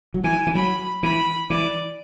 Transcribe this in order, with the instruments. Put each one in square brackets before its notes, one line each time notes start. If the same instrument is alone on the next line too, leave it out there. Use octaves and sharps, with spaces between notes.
[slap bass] F#3
[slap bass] E3 [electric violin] G#5
[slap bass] E3
[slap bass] F#3 [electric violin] B5
[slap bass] E3 [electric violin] B5
[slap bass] E3 [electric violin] D5